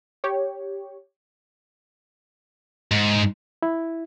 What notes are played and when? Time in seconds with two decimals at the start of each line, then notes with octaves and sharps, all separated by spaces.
0.24 G4 C#5
2.91 G#2
3.63 E4